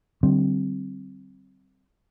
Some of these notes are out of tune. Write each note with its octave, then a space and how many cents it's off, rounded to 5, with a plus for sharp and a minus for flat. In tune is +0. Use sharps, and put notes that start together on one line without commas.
D3 +0 G3 -35 C4 +0